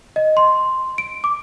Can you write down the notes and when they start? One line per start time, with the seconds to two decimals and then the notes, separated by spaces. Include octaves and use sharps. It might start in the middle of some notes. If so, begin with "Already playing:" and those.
0.16 D#5
0.37 C6
0.98 D7
1.24 D6